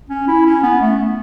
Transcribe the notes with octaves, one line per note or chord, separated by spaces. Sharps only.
C#4
E4
C#4
B3
A3